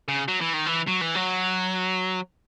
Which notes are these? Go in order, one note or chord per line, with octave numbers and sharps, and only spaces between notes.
C#3
F#3
E3
D#3
E3
F#3
E3
F#3